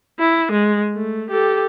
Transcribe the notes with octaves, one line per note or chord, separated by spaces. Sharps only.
E4
G#3
A3
G4 A4